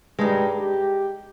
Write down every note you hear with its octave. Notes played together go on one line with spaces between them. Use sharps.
G2 G#3 D#4
G4